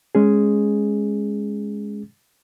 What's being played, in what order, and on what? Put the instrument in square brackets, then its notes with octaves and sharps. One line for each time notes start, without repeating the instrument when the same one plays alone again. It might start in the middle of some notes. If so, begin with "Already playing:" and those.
[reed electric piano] G#3 C#4 G#4